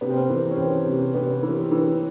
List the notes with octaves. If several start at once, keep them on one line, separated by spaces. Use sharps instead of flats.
C3 B3
C4
B3
E3
C#4
E3 C4
C3
C3 B3
E3
E3